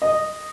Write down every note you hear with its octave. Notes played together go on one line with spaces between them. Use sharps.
D#5